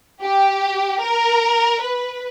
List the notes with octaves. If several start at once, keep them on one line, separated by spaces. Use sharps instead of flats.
G4
A#4
B4